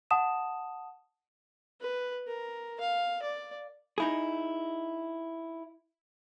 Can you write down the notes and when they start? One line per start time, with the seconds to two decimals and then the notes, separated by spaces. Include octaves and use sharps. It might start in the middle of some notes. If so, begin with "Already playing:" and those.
0.11 F#5 A5 D#6 E7
1.81 B4
2.27 A#4
2.80 F5
3.23 D5
3.98 D#4 E4 G#4